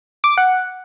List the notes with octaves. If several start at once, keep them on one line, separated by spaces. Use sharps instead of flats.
D6
F#5